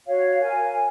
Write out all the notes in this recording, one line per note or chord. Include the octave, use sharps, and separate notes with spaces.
F#4 C#5 F5
A#4 F5 G#5